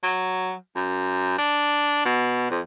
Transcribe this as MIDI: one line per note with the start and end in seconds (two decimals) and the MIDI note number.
0.03 0.55 54
0.76 1.34 42
1.38 2.05 62
2.05 2.48 47
2.50 2.60 41